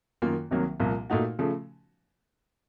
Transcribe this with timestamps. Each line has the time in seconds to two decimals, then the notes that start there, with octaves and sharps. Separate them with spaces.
0.22 F#2 D#3 A#3 F4
0.51 C2 C3 D#3 F#3 A#3
0.80 C2 A#2 F3 A#3
1.10 A#2 A3 D#4 F#4
1.39 C#3 F3 A3